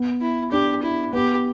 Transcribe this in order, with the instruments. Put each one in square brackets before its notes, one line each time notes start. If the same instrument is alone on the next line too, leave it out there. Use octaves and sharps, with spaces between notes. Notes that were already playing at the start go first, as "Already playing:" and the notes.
Already playing: [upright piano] B3
[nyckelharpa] E4
[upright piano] D4 [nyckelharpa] G4
[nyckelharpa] E4
[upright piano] B3 [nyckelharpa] G4